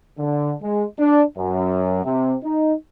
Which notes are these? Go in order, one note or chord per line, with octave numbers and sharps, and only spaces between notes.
D3
G#3
D4
F#2
C3
D#4